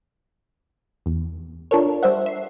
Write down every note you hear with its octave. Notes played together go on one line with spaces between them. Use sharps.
E2
D4 F4 A4 A#4 C#5
G3 C5 E5 F#5
E5 C7